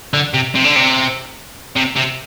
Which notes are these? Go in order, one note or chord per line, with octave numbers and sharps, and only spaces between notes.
D3
C3
C3
D3
C3
C3
C3